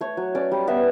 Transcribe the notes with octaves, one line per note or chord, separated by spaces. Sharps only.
A3 C#5
F#3
C#4 D5
G3
B3 E5